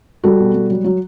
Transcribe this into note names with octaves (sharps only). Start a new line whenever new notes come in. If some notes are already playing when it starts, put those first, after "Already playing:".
G3 F#4 A4
B2
G3
F#3
F#3